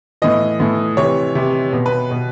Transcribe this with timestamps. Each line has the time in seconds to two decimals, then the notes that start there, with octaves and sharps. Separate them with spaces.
0.22 A2 E3 D#5
0.60 A2 E3
0.97 C3 E3 C#5
1.35 C3 E3
1.73 B2
1.86 B4
2.11 B2